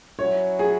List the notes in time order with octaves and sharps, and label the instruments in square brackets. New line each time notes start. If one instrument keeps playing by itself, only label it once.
[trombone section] F#3 C#4 E4 [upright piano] C#5
[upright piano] G#4